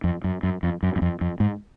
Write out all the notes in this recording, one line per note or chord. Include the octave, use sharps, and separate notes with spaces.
F2
F#2
F#2
F2
F#2
F#2
F2
F2
G#2